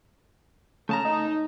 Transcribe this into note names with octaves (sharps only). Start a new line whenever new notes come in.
C#3 A3 A5 A#5
D#4